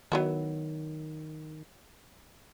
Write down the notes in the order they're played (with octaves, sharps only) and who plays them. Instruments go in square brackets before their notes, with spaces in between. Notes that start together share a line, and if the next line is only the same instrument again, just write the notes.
[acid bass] D#3 [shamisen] F#3 B3 E4